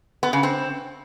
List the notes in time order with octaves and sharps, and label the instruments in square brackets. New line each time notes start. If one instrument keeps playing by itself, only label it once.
[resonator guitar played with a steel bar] B3
C#3
C4